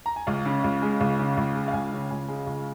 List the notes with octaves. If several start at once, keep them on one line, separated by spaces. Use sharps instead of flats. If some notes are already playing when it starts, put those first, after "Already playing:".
A#5
G#5
C#2 F5
C#3
C#2
G#3
C#2
C#3
C#2
G#3
F5
C#2 G#5
C#3
C#2 G#5
G#3
C#2